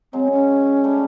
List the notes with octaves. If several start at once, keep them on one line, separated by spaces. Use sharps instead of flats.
F#3 G#3 C4
C#4
G3 A3